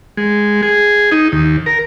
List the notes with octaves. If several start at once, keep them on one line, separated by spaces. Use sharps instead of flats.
G#3
G#4
D#4
D#2
A#4